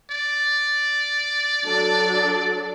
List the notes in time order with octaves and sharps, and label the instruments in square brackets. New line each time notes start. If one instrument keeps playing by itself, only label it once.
[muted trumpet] D5
[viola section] F#3 D4 A4